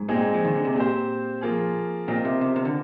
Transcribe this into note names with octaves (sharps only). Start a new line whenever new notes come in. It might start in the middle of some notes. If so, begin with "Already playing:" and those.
Already playing: G#2
A#2 G#3 C4 D#4 G#4
F3
D#3
D3
C3
A#2 C4 G4 C5
F3 A#3 F4 G#4
A#2 C4 F4 A#4 D#5
C3
C3
C3
D3